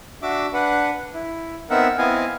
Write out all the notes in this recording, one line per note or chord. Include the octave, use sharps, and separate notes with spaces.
D4 F#4 E5 D6
D4 B4 F#5
E4
B3 C4 D#4 A#4 E5 F#5
B3 C4 E4 D#5 F5 G#5